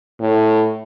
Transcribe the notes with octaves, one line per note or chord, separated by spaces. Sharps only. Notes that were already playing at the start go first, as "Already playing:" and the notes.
A2